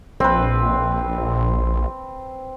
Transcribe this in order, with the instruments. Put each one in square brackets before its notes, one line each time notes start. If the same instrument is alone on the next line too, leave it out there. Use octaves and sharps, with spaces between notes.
[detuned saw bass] A#1 [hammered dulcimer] C4 B4